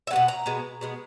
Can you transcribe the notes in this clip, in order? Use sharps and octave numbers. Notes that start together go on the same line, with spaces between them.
E5
G#3 B3 F#5
B2
A#5
B2 G#3 B3
B2 G#3 B3